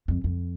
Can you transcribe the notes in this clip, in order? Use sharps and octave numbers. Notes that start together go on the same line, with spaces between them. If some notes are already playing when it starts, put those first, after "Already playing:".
F2
F2